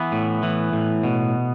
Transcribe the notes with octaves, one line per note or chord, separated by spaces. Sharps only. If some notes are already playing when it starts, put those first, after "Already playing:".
Already playing: E3 B3
A2
E3
A2
B2